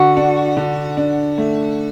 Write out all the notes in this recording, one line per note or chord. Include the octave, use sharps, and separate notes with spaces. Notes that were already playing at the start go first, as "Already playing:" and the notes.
Already playing: D3 F#4
D4
D3
D4
A3